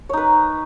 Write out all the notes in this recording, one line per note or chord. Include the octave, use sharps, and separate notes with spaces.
D#4 B4 C#5